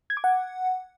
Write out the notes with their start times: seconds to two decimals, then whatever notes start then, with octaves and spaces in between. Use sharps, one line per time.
0.10 G#6
0.17 D6
0.24 F#5